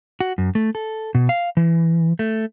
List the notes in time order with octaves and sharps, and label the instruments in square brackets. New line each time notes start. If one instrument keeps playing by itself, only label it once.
[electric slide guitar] F#4
F#2
A3
A4
B2
F5
E3
A3